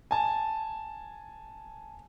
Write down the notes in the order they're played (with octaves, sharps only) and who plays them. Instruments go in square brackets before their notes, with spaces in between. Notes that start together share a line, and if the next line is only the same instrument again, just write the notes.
[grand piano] G#5 A5